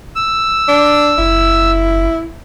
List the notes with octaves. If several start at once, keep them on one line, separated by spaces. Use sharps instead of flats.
E6
D4
F#1 E4